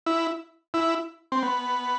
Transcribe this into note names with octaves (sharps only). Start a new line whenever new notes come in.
E4
E4
C4
B3